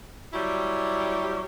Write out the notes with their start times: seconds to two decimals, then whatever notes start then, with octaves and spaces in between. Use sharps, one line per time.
0.34 F#3 G3 E4 G4 C#5